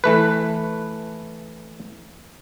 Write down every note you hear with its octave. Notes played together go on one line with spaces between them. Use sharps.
E3 A3 B4